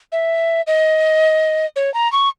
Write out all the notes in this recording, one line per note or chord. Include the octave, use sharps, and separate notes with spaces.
E5
D#5
C#5
A#5
C#6